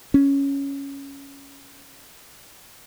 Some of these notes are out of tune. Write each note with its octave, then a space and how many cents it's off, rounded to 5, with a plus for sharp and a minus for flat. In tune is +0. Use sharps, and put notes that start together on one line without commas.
C#4 +5